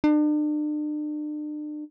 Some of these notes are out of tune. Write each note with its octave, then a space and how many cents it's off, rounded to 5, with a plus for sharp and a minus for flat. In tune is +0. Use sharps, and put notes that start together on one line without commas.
D4 +40